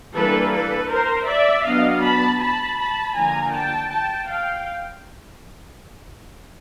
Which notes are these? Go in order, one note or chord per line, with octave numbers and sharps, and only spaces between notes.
E3 G3 A#3 D4 A4 B4
A4 B4
A#4 C5
D5 E5
F#3 B3 D4 D#5 F5
A5 B5
A5 B5
A5 B5
D3 F3 A#3 G#5 A#5
G5 A5
G5 A5
F5 G5